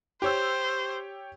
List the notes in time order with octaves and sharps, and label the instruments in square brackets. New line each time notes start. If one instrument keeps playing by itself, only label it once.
[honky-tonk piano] G4 C#5 E6 [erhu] C5